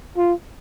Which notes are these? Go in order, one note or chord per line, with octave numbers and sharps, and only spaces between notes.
F4